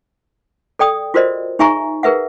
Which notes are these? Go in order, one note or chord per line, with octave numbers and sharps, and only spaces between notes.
A4 D5 G5 D#6
F4 F#4 A#4 C5 D5 D#5
D#4 G#4 E5 G#5 A#5 C#6
G#4 A#4 B4 E5 F#5